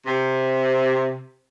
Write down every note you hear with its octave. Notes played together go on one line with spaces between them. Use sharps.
C3